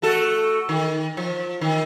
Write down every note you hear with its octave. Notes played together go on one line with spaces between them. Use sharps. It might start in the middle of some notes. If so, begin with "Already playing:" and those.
A3 F#4 A4
D#3
F3
D#3